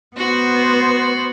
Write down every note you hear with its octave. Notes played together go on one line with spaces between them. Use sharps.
B3 F#4 C5